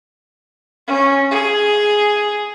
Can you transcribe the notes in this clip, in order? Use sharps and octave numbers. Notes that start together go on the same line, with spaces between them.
C#4
G#4